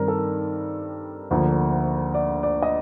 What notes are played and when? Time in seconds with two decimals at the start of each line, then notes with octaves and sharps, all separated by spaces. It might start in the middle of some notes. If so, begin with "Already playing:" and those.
Already playing: G2 D#3 G3 C4 A#4
0.08 A4
0.19 A#4
1.31 D2 D3 F3 A#3
2.14 D5
2.43 D5
2.62 D#5